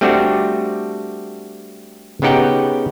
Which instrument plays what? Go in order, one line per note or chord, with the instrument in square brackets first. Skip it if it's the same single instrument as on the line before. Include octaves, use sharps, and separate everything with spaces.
[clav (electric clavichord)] G3 A3 C4 D4 F#4 G4
C#3 B3 D#4 G4 F#5 G5